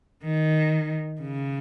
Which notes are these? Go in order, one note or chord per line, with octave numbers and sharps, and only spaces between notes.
D#3
C#3